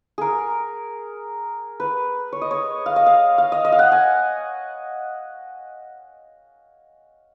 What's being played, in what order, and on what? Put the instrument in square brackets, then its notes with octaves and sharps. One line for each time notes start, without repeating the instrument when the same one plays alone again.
[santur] G#4 A#4
B4
C#5
D#5
C#5
F5
D#5
F5
F5
D#5
D#5
F5
F#5
G#5